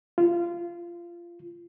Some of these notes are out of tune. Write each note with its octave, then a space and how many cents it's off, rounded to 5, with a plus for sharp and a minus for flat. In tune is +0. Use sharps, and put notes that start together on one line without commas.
F4 -20